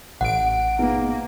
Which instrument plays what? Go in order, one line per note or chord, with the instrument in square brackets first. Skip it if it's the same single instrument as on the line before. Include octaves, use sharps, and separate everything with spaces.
[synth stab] A1 D7 [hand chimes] F#5
[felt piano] G#2 B2 [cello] A#3